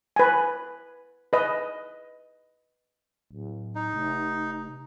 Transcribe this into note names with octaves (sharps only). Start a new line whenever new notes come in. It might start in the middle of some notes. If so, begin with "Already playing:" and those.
B4 G#5
B4 D#5
D1
D#4
F1